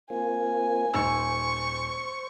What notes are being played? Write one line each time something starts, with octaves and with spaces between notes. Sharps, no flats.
A#3 C4 F4 G#5
D#1 D#4 C5 C#6 E6